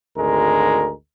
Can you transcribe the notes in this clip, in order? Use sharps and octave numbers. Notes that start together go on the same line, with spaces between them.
G#1 D2 G#3 A#4